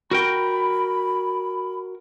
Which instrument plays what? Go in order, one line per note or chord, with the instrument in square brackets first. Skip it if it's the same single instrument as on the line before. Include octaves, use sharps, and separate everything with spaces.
[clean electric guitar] F#4 A#4 G5 [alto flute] B5